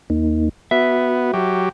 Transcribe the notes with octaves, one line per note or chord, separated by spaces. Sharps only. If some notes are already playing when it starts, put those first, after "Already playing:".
D#2 A#3 D#4
B3 F#4 E5
F#3 G4